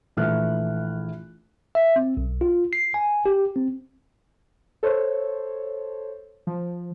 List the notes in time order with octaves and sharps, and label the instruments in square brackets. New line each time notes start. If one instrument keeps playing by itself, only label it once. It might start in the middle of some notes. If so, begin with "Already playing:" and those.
[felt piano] A#1 E3 A3 F6 F#6
[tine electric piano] E5
C4
B1
F4
C7
G#5
G4
C4
[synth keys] A4 C5 C#5
F3